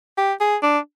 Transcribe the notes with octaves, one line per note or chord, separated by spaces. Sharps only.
G4
G#4
D4